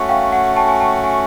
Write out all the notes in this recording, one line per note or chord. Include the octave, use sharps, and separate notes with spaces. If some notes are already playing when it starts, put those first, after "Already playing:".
Already playing: A3 C#4 F#4
F5 G5
F#5 G#5
G5 A5
G#5
G5 A5
F#5 G#5